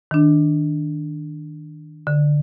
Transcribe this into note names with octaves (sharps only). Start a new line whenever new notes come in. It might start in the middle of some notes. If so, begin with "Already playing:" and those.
D#3 D4
D3